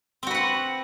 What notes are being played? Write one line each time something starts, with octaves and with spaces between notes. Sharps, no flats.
C4 F#4 B4 F#5